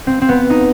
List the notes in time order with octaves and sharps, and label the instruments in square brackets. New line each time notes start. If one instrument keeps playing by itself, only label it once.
[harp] C4
C4
B3
D#4